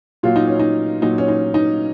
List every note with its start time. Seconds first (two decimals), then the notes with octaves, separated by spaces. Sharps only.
0.23 A#2 F#3 F4
0.36 D#4
0.47 C#4
0.59 D#4
1.02 A#2 F#3 D#4
1.18 C#4
1.28 D#4
1.54 D#4